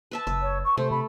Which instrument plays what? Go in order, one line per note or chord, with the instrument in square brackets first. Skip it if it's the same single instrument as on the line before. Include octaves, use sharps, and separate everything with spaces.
[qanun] B4 E5 A5
[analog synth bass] F#1 [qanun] E5
[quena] C#5
C#6
[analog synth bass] C3 [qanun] A3 [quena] C5
[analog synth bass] C3 [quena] B5